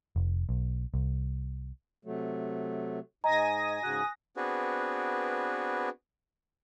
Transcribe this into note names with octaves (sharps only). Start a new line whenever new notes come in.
F1
B1
C2
C3 F#3 A3
G#2 D#5 G#5 A#5 D#6 A#6
G#2 C#3 F#4 F#6
B3 C4 D4 F#4 G#4 B4